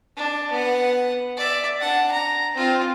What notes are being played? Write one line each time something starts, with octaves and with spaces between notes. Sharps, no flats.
D4
B3 F#5
D5 E5
D4 F#5
A#5
C4 F4